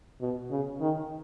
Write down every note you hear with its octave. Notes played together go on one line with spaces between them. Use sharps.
B2
C#3
D#3